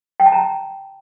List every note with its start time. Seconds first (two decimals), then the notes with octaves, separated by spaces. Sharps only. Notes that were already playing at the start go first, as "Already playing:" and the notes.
0.20 G5
0.26 A5
0.32 A#5